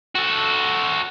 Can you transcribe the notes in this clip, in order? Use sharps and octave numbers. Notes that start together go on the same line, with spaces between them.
F#4 A4